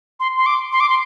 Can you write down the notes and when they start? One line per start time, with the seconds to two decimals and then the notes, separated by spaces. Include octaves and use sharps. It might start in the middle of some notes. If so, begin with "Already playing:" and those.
0.20 C6
0.37 C6
0.46 D6
0.72 C6
0.80 D6
0.89 C6